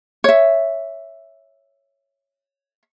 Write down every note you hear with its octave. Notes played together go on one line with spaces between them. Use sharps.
C#5 E5